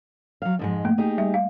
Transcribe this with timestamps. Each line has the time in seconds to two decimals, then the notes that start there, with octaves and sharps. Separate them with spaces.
0.42 F#3 F5
0.59 F2 G#2 G#3
0.85 A3 A#3
0.98 D#4 G4 G#4
1.18 G3 E5
1.34 F5